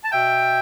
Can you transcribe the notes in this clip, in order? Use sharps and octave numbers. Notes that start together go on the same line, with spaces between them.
A5
B2 E5 G5